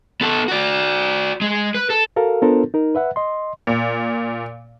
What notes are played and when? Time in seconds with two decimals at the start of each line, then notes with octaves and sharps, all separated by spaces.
0.21 B3 A4
0.48 F#4 D5
1.41 G#3
1.75 B4
1.90 A4
2.16 F#4 A4 A#4 F5
2.42 B3 D4 F4 A4 A#4 C5
2.74 D#4 A#4
2.95 B4 E5 F#5
3.16 D#5 C6
3.67 A#2